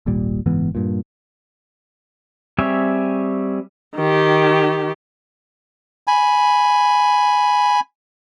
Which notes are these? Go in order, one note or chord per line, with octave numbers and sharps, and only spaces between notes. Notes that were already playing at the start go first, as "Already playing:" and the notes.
D#1 G#1 A#2 G3
F#1 G#2 E3 B3
G2 A#2
G3 C4 G#4 C#5 E5
D#3 G4
G#5 B5